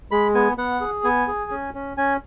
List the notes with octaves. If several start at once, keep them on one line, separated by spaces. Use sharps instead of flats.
G#3 B5
B3 G#5
B3 F#5
G#4
B3 G#5
G#4
C#4
C#4
C#4 G#5